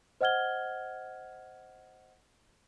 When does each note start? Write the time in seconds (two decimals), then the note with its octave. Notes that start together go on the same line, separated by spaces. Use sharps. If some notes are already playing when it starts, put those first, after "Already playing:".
0.21 C5 D#5 F#5 F6 G#6 G7